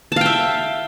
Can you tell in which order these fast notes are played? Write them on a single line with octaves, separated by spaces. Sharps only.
A5 F5 G5 E5